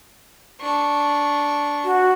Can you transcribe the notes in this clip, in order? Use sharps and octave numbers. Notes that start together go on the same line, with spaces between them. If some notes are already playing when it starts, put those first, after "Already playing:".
D4 C#6
F#4